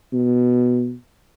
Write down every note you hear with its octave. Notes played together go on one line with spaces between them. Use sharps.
B2